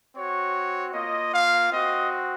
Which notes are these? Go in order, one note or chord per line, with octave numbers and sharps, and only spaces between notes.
C4 F#4 C#5
A#3 F4 D#5
F5
C4 F#4 D#5